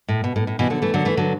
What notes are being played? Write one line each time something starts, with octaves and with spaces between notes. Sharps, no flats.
A2
B2
A2
A2
B2 E3
D3 F#3
E3 A3
D3 F#3
E3 A3
D3 F#3